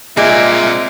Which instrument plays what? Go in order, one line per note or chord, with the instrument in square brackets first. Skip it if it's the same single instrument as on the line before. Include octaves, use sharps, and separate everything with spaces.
[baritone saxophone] A#2 [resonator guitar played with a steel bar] G#3 [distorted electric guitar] C4 D5 [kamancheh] E5